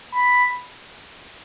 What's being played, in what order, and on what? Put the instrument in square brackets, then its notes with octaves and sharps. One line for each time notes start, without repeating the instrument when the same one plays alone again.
[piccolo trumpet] B5